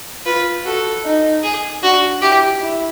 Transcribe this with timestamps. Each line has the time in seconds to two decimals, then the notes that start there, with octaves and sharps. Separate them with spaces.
0.26 F4 B4
0.65 F#4 A4
1.05 D#4
1.43 G#4
1.83 D4 F#4
2.22 E4 G4
2.61 E4